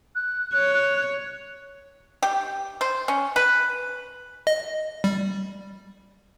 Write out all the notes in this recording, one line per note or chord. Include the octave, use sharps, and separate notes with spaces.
F#6
C#5
G4
C5
C#4
B4
D#5
G3